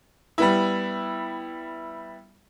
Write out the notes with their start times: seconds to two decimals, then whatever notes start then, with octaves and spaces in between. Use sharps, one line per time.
0.38 G3 B3 E4